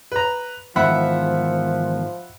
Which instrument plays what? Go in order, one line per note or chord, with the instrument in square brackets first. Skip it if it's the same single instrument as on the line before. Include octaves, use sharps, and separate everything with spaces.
[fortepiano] B4 A#5
[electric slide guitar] E2 G#2 D#3 [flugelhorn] F3 [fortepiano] E5 F#5 B5